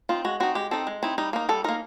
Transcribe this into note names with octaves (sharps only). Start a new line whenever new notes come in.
C4 D#4 F4
G#3 F#4
C4 D#4 F#4
G#3 G4
C4 D#4 A4
G#3
C4 D#4 E4
G3 D#4
A#3 D#4
G3 A4
A#3 D#4 A#4